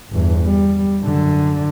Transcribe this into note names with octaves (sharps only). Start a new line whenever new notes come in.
G1 E2
G3
F#2 D3